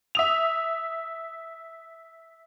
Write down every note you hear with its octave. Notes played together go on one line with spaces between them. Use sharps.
E5 D#6 F7